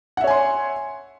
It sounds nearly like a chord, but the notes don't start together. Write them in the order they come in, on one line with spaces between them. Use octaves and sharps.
F#5 E5 C#5 G#5 C6